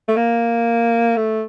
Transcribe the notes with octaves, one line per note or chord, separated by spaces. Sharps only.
A3
A#3
A3